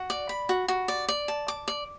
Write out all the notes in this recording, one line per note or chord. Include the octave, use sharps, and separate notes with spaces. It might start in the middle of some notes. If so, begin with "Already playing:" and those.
Already playing: F#4
D5
B5
F#4
F#4
D5
D5
A5
D6
D5